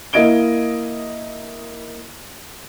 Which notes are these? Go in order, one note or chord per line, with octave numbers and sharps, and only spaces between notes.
A#3 E4 D#5 G#6 D7 G7